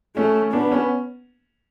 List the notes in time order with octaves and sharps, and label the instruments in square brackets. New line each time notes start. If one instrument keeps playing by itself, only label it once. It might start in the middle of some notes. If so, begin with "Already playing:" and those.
[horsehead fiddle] A3 [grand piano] C#4
[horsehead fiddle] B3 [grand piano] D4
[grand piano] C#4